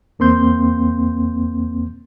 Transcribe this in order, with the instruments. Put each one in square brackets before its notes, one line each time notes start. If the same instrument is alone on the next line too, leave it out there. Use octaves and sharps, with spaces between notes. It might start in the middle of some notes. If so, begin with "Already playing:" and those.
[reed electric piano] E2 A#3 C4 C6 G6